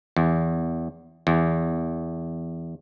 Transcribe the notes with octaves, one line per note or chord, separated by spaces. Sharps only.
E2
E2